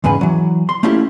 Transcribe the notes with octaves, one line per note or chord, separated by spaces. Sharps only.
E2 G#2 C#3 B4 G#5
E3 F#3
C6
A3 A#3 C#4 E4 F4 G4